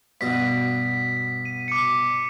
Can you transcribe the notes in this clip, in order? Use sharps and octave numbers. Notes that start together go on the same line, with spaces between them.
G2 B2 F#4 B6
D#7
D6 C#7